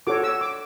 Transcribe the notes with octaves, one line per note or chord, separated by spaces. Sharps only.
F#4 A4 C#5 D6
E6
D6